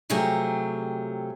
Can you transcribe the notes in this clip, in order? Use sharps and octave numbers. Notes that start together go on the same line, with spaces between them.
C3 F3 F#3 A3 G4 G#4